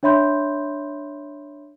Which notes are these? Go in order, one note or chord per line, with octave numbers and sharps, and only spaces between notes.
D4 C#5 E5 B5 C6 G6